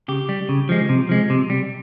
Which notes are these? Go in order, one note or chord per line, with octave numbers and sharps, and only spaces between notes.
C#3 G4
G3
C#3
F3 G#3
C3
F3 G#3
C3
G3